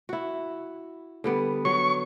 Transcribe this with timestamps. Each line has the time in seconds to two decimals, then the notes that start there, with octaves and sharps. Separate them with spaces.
0.09 E4 F#4
1.24 D3 G3 B3
1.65 F#3 C#6